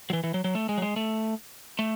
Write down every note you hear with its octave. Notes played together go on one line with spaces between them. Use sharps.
F#3
E3
E3
F#3
F#3
A3
G#3
F#3
G#3
A3
A3